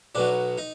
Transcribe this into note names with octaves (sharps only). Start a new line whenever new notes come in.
B1 B2 F#3 D4
D#4